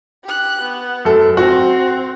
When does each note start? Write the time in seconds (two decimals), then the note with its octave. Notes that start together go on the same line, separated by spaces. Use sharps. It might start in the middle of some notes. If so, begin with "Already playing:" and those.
0.24 G4 F#6
0.61 B3
1.05 F#2 A4
1.37 C4 F#4